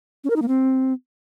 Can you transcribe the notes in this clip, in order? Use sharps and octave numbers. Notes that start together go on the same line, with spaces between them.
C#4
A#4
D#4
A#3
C4